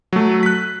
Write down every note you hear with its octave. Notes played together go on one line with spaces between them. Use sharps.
F#3 A3
F#6 B6